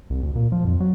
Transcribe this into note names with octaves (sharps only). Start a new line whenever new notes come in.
C2
D2
A#2
F3
F2
F#3